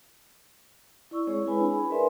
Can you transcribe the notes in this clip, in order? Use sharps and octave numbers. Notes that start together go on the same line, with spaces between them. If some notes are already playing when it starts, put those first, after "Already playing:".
E4 D5 C#6 E6
G#3 C4 G#4 C#5
E4 G#4 B4 G#5 B5
D4 G#4
B5
A#4 B4 D5 E5 G#5 C6